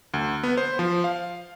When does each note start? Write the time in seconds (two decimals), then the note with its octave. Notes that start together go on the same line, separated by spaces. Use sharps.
0.14 D2
0.43 B3
0.57 C5
0.79 F3
1.04 F5